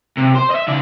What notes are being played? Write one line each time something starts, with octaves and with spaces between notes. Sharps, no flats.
C3
C5
D#5 E5
C#3 D5